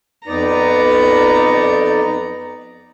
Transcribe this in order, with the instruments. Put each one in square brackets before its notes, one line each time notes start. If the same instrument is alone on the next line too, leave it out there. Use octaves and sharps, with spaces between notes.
[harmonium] F2 D#4 D5 [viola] B3 A#5